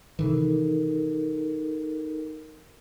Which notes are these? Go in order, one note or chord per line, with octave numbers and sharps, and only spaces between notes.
C3 D#3 E3 D#4 A4 A#4